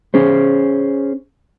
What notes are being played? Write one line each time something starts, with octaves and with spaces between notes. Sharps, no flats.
C#4 G#4 C5